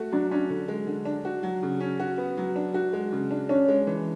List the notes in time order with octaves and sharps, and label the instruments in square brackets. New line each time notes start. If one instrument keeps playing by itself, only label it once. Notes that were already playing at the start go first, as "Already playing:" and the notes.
Already playing: [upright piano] A3 F#4
[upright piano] F#3 [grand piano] D4
[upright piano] C#4 [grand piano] D4
[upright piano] D3
G#3
D3
D4
F#4
F#3
C#3
C#4
F#4
B3
F#3
D4
F#4
G#3
C#3
D4
[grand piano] C#4 [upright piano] D4
[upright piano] G#3
E3